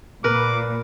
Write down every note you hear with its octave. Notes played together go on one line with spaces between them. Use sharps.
A#2 A#4 B4 D6